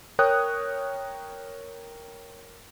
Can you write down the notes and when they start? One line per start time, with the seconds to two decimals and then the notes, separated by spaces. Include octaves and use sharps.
0.19 A#4 C#5 G5 D#6 F#6